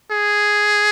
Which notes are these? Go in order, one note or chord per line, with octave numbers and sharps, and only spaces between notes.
G#4